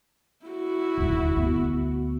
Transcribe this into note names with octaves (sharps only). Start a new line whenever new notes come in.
E4 F#4
D#1 D2
D2 B3